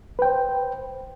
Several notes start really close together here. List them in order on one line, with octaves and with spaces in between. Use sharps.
B4 G5 C5